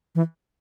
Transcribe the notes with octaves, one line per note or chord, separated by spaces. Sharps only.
E3